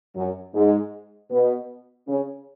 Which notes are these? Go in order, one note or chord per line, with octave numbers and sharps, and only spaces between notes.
F#2 F#3
G#2 G#3
B2 B3
C#3 C#4